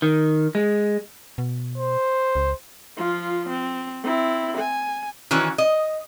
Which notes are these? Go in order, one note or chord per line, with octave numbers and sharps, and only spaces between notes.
D#3
G#3
B2
C5
C#2
F3 F4
C4
C4 E4
G#5
D#3 E3 C#4 F#4
D#5